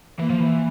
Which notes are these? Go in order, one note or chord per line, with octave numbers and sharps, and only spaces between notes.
E3 A#3
F3
E3